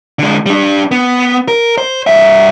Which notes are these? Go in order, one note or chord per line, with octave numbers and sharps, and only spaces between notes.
D3 G#3
G3 D4
B3
A#4
C5
G2 E5